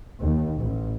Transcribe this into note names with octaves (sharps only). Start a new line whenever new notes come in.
D#2
A1